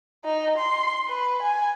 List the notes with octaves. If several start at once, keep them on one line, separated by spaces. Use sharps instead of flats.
D#4
C6
B4
G#5